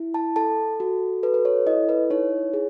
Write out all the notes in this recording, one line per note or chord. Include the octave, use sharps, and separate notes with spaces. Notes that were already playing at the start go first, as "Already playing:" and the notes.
Already playing: E4
A5
A4 A5
F#4
A4 B4
B4
C#5
E4 D#5
B4
D#4 C#5
G#4